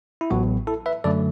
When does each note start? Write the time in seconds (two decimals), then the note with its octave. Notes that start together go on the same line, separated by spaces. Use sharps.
0.21 E4
0.30 A1 A2 F#3 B3 F#4
0.67 E4 A4
0.86 B4 E5
1.04 F#2 D3 F#3 A3 A4 D5